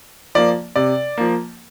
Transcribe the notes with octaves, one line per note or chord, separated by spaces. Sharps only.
F3 A#3 D5
C3 D5
F3 A#3